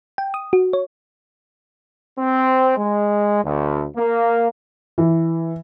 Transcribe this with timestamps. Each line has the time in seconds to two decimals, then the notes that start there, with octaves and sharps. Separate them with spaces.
0.18 G5
0.34 D#6
0.53 F#4
0.73 C#5
2.18 C4
2.77 G#3
3.43 D2
3.97 A#3
4.98 E3